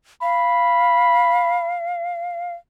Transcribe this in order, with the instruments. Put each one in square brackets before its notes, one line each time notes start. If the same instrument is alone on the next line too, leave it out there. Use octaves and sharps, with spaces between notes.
[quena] F5 [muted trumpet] B5